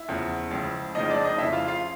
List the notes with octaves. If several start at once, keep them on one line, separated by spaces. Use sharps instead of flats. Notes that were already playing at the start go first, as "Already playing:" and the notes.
Already playing: E4
E2 C#3 F3
C#2 C#3 F3
C#2 C#3 F3 D#4 D#5
D4 D5
D#4 D#5
F2 C#3 F3 E4 E5
F4 F5
F4 F5